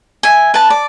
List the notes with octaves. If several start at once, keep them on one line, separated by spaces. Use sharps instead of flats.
E5 G#5
B4 A5
D5